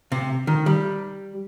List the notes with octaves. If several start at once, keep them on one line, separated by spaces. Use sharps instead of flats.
C3
D#3
G3